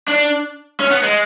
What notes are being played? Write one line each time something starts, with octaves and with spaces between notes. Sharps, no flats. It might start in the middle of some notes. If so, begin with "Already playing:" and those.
D4
C#4
B3
G#3